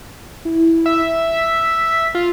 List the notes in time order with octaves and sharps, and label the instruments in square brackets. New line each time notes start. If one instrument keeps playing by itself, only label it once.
[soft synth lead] E4
[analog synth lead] E5
[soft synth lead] B6
[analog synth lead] F4